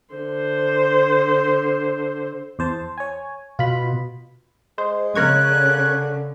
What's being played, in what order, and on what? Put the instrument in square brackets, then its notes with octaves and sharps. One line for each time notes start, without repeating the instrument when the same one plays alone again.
[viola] D3 C5
[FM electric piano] E2 C5 A5
C#5 G#5
[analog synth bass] B2 [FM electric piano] F4 B5
[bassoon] G#3 [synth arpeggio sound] C5
[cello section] C#3 [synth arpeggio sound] A#4 C#5 G#6 [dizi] F#6
[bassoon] D3